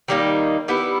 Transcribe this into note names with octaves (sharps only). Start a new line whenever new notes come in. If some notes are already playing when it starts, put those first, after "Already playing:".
D#3 G3 A#3 D#4
G3 B3 E4